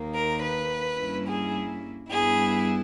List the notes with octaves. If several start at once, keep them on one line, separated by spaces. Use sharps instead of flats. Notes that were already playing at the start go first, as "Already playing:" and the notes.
Already playing: D#2 D#3 A#3
A#4
B4
G2 G3 A#3 C#4 E4
G#4
G2 G3 B3 E4 G#4